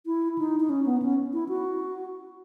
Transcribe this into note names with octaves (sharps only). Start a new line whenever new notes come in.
E4
D#4
D#4
C#4
B3
C#4
E4
F#4